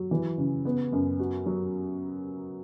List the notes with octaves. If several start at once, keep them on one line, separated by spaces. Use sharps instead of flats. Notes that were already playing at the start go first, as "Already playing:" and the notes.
Already playing: F#3
E3
C#3
B3
F#2
F#4
F#3